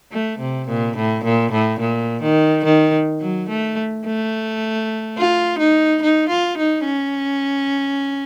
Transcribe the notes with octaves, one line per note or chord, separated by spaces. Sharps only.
A3
C3
A#2
A2
A#2
A2
A#2
D#3
D#3
F#3
A3
A3
F4
D#4
D#4
F4
D#4
C#4